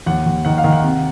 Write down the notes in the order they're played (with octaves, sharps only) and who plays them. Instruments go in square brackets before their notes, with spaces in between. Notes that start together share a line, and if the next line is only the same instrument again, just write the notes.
[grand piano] D#2 F#5
D#2
D#3 F#5
F5
D#3
F#5
C3